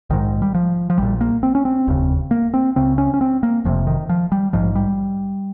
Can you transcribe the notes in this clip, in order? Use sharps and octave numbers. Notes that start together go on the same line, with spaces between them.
A#1 G#2 D#3
G3
F3
F3
A#1 A#2 G3
A#3
C4
C#4
C4
F1 D#2 C#3
A#3
C4
C#2 C#3 C4
C#4
C#4
C4
A#3
F1 F2 C3 F3
D#3
F3
G3
A#1 G#2 F3
G3